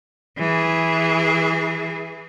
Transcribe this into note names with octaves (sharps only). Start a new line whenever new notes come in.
E3 G#4